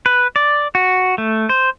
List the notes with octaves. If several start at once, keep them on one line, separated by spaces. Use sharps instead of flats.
B4
D5
F#4
A3
C5